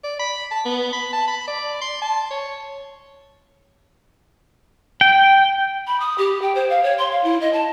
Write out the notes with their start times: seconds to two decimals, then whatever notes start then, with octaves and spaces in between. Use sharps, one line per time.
0.04 D5
0.19 B5
0.51 A5
0.65 B3
0.93 B5
1.13 A5
1.28 B5
1.48 D5
1.81 C6
2.02 A5
2.30 C#5
5.01 G5
5.87 B5
6.00 D#6
6.18 G4
6.42 G5
6.55 C5
6.70 F5
6.83 C#5
6.98 C6
7.12 F5
7.24 E4
7.41 D#5
7.53 A5